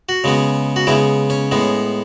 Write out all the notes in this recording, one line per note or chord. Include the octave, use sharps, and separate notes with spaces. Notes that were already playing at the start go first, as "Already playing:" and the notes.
F#4
C#3 G#3 B3
F#4
C#3 G#3 B3 E4
C#4
A2 G#3 B3